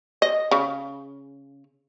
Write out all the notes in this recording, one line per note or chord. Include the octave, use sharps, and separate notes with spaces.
D#5
C#3